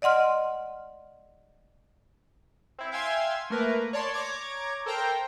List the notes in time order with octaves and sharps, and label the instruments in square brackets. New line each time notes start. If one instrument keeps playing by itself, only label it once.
[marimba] D5 D#5 F#5 C6 F6
[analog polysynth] C4 E4
E5 F5 G5 G#5 C6 G#6
A3 A#3 A#4 B4
C#5 D5 A5 C6
C#5 A#5 D6 G#6
A4 A#4 C5 G5 A#5